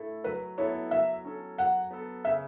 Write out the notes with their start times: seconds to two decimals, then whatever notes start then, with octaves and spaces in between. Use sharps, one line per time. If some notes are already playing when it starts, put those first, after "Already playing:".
Already playing: A2 A3 E4 A4
0.24 F#3 B4
0.58 B3 E4 A4 C#5
0.91 F#3 E5
1.24 C#4 A4
1.58 F#3 F#5
1.91 B3 A4
2.25 C#3 E5